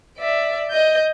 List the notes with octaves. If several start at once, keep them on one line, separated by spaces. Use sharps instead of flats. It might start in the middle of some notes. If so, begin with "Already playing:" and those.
D5 E5
D#5 G6